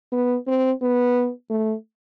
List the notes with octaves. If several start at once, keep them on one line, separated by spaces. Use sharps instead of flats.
B3
C4
B3
A3